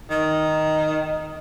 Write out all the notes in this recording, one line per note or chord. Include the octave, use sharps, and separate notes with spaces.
D#3